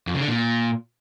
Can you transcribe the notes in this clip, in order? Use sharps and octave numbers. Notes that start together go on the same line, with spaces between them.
F2
C#3
D3
A#2